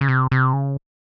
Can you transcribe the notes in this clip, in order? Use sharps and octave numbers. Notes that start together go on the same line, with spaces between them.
C#3
C3
C3
C#3